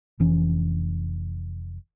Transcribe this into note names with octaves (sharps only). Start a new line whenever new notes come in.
F1 E3 C#4